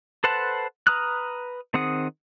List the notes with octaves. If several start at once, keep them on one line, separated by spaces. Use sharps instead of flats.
A4 B4 C5 F#5 A5
B4 A#5 D#6 F6 F#6
D#3 C4 G#4 F#5 D#6